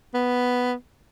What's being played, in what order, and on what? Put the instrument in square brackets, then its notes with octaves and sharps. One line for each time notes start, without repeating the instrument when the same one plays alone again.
[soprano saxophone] B3